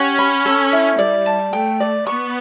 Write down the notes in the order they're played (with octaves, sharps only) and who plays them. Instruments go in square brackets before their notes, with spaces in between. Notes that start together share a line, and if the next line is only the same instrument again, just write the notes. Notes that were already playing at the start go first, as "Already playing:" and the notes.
Already playing: [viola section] C#4 [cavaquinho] G4 F#5
[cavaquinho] B5
A4
E4
[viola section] G3 [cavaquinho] D5
[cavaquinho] A5
[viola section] A3 [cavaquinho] G5
[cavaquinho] D5
[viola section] B3 [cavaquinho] C#6